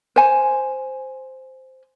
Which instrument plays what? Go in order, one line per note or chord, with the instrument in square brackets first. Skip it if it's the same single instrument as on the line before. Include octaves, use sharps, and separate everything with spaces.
[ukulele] C5 G#5